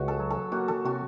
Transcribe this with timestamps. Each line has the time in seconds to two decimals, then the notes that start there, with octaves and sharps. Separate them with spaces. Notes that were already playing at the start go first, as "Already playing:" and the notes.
Already playing: C#2 F#4
0.08 A4
0.20 F#3
0.30 A4
0.52 A#3 F#4
0.68 A4
0.85 C3 F#4